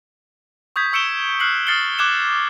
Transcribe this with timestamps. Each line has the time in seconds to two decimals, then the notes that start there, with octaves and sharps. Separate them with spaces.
0.76 C#6 D#6 G6 G#6 B6
0.93 C#6 E6 C#7 D7 E7 G7
1.40 F6 F#6 C7 C#7 F#7
1.67 D#6 F6 A6 C7 C#7 G7
1.99 D6 F#6 G#6 E7